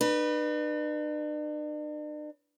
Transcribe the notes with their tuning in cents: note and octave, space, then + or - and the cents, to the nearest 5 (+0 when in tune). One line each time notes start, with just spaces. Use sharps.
D4 +45 B4 -15